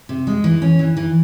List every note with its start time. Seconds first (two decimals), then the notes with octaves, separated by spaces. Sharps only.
0.09 C3
0.27 G#3
0.44 E3
0.62 C#4
0.79 E3
0.97 E3